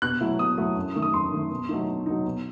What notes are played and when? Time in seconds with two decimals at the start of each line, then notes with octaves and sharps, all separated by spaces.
0.02 B2 F#6
0.21 F#3 A3 E4
0.39 B2 D#6
0.58 F#3 A3 E4
0.76 F#2
0.95 D#3 A3
1.02 D#6
1.13 F#2 C6
1.32 D#3 A3
1.50 B2
1.69 F#3 A3 D#4
1.88 B2
2.06 F#3 A3 D#4
2.25 B2